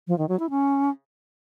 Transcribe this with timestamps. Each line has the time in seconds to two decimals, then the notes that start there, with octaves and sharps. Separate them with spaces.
0.08 F3
0.18 D#3
0.29 F#3
0.39 E4
0.50 C#4